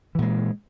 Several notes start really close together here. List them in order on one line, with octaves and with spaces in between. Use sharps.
E3 A#2 G#3